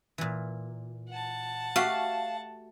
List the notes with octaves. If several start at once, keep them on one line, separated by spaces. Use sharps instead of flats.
A#2 E3
F#5 A5
A3 F#4 G4 F5